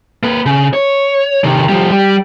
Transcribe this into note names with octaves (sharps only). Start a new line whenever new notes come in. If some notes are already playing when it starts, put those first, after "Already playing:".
A#3 B4
C#3
C#5
C3 D#3
F3 G3
G3